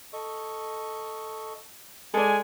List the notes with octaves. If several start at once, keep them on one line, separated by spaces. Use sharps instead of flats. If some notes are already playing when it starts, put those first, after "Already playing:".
A4 D#5 C#6
G#3 A4 D5 G#5